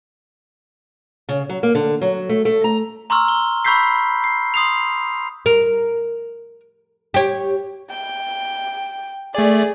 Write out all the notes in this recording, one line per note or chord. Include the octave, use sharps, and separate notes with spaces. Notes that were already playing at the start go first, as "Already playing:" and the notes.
C#3
F#3
A#3
D3
F#3
A3
A3
A#5
A#5 C6 C#6 E6 F6
G7
B5 C#6 E6 G6 B6 C7
C7
C6 D#6 C7 F7
A#4
G4 C#5
G5
A3 G#4 D5